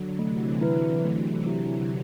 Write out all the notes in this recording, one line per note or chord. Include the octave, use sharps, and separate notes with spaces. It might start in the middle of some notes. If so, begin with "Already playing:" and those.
Already playing: D3 F#3
C3 E3 A3
E4 B4
A3
E4 G4